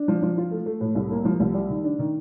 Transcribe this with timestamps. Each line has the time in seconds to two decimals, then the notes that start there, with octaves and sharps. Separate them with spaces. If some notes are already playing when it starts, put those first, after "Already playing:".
Already playing: D4
0.08 F3
0.22 F3
0.38 F4
0.51 A3
0.66 A3
0.81 A2
0.95 C2
1.11 A#3
1.25 F3
1.40 C2
1.54 G3
1.70 D#3
1.84 D4
1.99 D#3